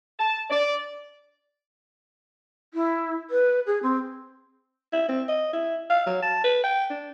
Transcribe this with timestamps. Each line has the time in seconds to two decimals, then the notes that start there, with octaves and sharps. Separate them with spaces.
0.19 A5
0.50 D5
2.74 E4
3.30 B4
3.66 G#4
3.83 C4
4.93 E4
5.09 C4
5.28 D#5
5.53 E4
5.90 F5
6.06 F#3
6.22 A5
6.44 B4
6.64 G5
6.90 D4